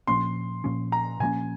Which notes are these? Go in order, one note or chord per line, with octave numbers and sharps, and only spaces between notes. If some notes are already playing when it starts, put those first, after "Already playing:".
A#2 F3 A#3 C#4 C6
A#2 F3 A#3 C#4
A#5
A#2 F3 A#3 C#4 G#5